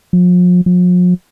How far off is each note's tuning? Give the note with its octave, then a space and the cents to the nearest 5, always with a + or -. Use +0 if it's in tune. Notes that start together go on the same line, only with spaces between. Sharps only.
F3 +40
F3 +45